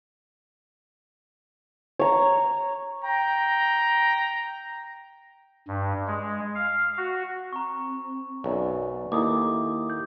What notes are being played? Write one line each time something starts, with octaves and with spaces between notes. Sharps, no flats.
C#5 A#5
G5 A#5
G2
G#3
F5
F#4
C4 A#5 C#6
B1 F#2 D5
D#2 A#3 E4 A4 D6 D#6
G4 G6